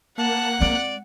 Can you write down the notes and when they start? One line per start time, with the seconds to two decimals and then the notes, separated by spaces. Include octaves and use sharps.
0.18 A#3 F#5 A5 F#6
0.60 G#3 C4 D5